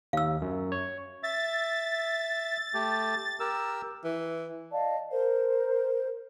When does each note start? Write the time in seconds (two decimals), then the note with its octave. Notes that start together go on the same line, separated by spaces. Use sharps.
0.13 D#2 F5 E6
0.42 F#2
0.72 C#5
1.23 E5 A6
2.74 A3 G4
3.40 G4 A#4 E6
4.04 E3
4.71 D5 D#5 F5 A5
5.11 A#4 C5